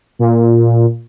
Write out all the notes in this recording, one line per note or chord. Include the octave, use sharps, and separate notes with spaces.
A#2